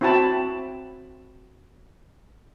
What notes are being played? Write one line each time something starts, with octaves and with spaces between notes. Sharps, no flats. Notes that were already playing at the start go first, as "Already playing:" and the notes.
C4 E4 F#4 G5 A5 B5